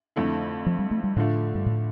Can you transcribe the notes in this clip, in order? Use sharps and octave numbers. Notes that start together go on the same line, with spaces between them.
F2 D3 A3 E4
F3
G3
A3
G3
A2 D3 F3 A3
G2
A2